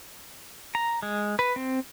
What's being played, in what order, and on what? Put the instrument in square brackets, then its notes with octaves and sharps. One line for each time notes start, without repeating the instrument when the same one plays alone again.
[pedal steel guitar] A#5
G#3
B4
C4